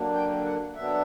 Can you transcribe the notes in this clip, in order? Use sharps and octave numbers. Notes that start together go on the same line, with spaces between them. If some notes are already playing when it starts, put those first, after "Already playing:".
Already playing: D3 F#3 A#3 D4
G5
F#5
D3 F#3 B3 D4 E5